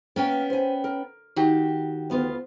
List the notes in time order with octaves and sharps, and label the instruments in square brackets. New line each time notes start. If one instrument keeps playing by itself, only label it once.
[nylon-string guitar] A#3 [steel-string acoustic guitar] B3 C#4 G5
[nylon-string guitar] C5 G#5
A#4
[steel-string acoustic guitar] D#3 F#4 G4
[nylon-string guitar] D2 B3 F4